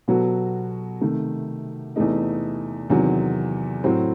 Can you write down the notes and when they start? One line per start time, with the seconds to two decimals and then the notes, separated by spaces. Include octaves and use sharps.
0.08 B2 F#3 B3 F#4 A4
1.01 C3 D#3 A3
1.96 E2 C3 E3 A3 D#4
2.90 E2 C3 D#3 F#3
3.84 A2 F#3 C4